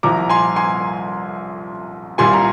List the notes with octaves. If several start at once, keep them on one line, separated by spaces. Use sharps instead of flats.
C2 A#2 F3 A#5 D6
G#5 C6
G#5 C6
C2 A#2 G3 G#5 C6
A#5